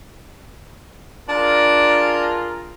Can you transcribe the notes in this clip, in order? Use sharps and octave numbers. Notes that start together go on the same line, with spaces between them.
D4 F4 G#4 A#4